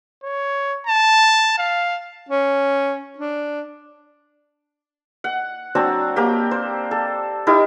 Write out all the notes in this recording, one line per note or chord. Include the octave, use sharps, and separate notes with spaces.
C#5
A5
F5
C#4
D4
F#5
F#3 C4 D4 E6
A#3 G4
C5
A4
D#4 E4 G4 A#4